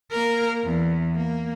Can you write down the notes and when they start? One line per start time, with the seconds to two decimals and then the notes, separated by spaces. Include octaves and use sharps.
0.11 A#3 A#4
0.64 E2
1.15 A#3